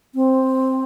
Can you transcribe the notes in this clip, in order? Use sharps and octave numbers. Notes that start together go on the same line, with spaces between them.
C4